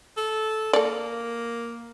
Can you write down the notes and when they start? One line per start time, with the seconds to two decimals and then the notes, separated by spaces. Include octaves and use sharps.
0.17 A4
0.73 A#3 A4 D5